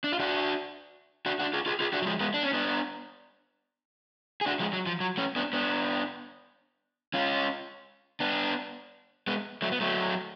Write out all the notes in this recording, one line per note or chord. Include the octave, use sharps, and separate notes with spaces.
D4
F4
D4 F#4
D4 F#4
D4 F#4
F4 G#4
F4 G#4
F4 G#4
D4 F#4
F#3
F3 G#3
G#3 B3
D4
C#4
B3 D4
G#4
D4 F#4
F3 G#3
F#3
F3
F#3
A3 C#4
B3 D4
B3 D4
C#4 F4
B3 D4
G#3 B3
F#3 A3
B3
F#3 A3